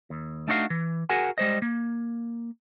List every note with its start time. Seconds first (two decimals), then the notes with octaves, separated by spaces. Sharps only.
0.10 D#2
0.48 A3 D4 D#4 F#4 C#5 F5
0.70 E3
1.09 F#4 G#4 A#4 F#5 G#5
1.38 G3 G#3 C5 D#5
1.62 A#3